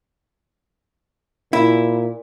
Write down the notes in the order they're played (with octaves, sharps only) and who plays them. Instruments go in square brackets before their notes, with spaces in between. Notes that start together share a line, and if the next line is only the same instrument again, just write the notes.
[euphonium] A#2 [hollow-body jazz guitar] E4